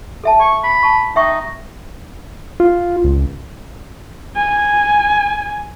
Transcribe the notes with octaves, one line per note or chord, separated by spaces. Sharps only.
A4 E5 A5
C#6
B5
A5 C#6
D#4 E5 G5 C#6
F4
C#2
G#5